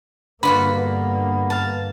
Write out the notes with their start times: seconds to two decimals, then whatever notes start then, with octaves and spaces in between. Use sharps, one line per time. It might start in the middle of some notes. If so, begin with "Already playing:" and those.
0.43 G2 D3 A#3 F4 F#4 B4 B5
0.75 B3
1.50 F5 A5